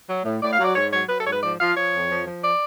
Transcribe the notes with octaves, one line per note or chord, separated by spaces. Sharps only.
F#3
A2
A2 D5
F5
F#3
D5
G#2 C#5
F#3 C#5
F#3 B4
A4
G#2 C#5
B4
F3 D5
F3 F5
F3 C#5
F2
F3
F3
D5